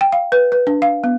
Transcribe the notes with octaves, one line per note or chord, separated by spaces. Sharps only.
G5
F5
B4
B4
D4
F5
B3